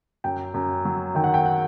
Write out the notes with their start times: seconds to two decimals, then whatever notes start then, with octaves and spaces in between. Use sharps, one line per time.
0.24 F#2 G5
0.54 F#2
0.85 F#3
1.15 D#3 G5
1.24 F#5
1.34 G5
1.46 F#5